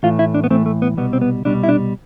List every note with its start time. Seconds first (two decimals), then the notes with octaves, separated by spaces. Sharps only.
0.03 A2 E3 A3 F4
0.19 E4
0.34 D4
0.44 B3
0.50 A2 E3 A3 C4
0.66 A3
0.82 B3
0.97 C2 B2 G3 B3
1.13 C4
1.21 B3
1.45 C2 B2 G3 D4
1.63 E4
1.69 D4